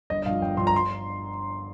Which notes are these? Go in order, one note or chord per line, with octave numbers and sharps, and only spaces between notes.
G1 D#5
D#5
G2 F3 F5
G1 G5
G2 F3 C6
A#5
C6